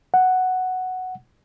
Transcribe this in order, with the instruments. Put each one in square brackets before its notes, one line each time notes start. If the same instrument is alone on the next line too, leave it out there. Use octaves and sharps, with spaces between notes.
[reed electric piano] F#5